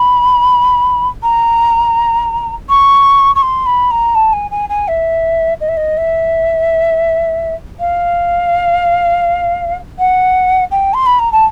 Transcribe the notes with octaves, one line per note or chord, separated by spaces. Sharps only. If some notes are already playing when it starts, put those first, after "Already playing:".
Already playing: B5
A#5
C#6
C#6
C6
B5
A#5
A5
G#5
G#5
G#5
E5
D#5
E5
D#5
E5
F5
F#5
G5
C6
B5
A#5
A5